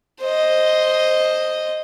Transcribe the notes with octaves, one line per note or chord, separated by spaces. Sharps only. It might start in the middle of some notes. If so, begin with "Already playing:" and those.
C5 D#5